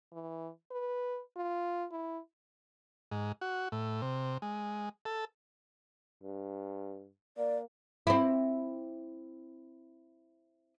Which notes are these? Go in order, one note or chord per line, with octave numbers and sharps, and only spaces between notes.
E3
B4
F4
E4
G#2
F#4
A2
C3
G#3
A4
G2
A#3 D5
C4 E4